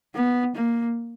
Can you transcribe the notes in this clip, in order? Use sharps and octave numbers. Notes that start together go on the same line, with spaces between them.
B3
A#3